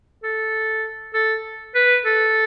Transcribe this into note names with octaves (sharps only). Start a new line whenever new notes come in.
A4
A4
B4
A4